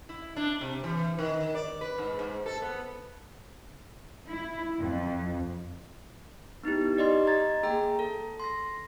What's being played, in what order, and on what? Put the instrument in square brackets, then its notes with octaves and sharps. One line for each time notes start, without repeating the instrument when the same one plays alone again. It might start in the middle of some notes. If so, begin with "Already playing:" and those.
[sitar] E4
D4
C3
E3
D#3
D5
B4
G#2
G#2
A4
B3
[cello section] E4
F2
[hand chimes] B3 D#4 E4 G4
D#4 G4 D5 D#5 C6
D#5 A#5 G#6 A6
A#3 G#4 G5 A#5
A4
C6 A#6